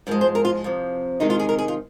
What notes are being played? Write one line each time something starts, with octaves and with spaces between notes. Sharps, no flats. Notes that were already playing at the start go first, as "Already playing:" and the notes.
G#2 F3 G#3 A#4
C5
A#4
F4
F2 C3 F3
C3 D#3 G#3 D#4
F4
G#4
A#4
G#4
F4